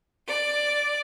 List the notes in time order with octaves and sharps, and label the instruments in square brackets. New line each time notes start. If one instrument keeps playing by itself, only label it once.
[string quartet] D5